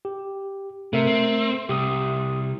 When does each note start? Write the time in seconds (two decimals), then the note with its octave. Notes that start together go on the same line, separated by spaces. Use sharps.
0.05 G4
0.93 C3 A3 A#4 E5
1.07 C4
1.69 C2 G4 D#6